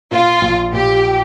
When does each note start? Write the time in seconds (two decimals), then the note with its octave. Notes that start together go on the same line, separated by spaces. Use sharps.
0.11 A#2 F4
0.41 A#1
0.72 A#2 G4